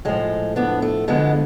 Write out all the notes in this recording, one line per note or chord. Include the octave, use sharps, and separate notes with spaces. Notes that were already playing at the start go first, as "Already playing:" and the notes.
A2 F3 G#3
B3 D4
A3
F2 D3 F3 G#3 B3